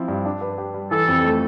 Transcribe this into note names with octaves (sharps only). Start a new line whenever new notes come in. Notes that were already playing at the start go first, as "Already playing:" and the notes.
Already playing: F3 C4 E4
G2
D4
B4
G4
G3
E3 A4
F2
A3